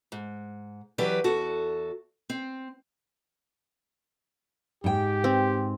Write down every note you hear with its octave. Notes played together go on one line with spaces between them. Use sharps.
G#2
E3 F#3 G4 G#4 B4 D5
E2 F#4 A4
C4
G#2 G4 G5
C4